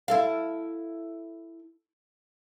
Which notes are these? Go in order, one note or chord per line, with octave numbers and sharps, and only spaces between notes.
E4 A4 F5